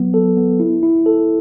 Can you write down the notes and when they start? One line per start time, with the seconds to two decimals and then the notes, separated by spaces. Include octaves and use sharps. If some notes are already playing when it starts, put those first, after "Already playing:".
Already playing: F#3 B3
0.14 A4
0.37 B3
0.60 E4
0.83 E4
1.06 A4